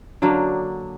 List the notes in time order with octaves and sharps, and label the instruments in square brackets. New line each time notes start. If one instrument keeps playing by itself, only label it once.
[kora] D3 F#3 A#3 D4